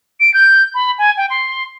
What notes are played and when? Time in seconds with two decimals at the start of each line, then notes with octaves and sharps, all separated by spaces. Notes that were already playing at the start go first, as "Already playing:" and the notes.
0.20 D7
0.34 G6
0.74 B5
0.98 G#5
1.17 G5
1.30 C6